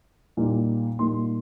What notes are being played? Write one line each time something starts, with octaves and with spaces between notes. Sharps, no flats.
A#2 G3 A#3 D#4
A#2 G3 A#3 D#4 C6